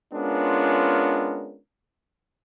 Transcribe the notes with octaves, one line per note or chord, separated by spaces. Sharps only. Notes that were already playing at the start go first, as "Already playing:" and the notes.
G#3 B3 C#4 D4 F4 A#4